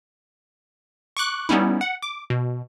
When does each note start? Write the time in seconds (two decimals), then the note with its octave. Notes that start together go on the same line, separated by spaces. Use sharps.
1.17 C#6 D6 F#6
1.49 G3 B3 C#4 D#4 E4
1.81 F#5
2.02 D6
2.30 B2